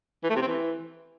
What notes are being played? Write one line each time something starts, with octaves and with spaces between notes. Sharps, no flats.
E3
A3
C3
C4
E3